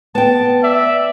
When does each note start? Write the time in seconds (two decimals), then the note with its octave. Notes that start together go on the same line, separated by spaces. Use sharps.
0.15 B3 G5 A5
0.63 D5 E5